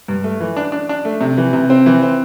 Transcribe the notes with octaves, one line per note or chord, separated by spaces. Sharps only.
G2
A3
E3
D4
D4
D4
A3
C3
E3
C3
C4
E3
C4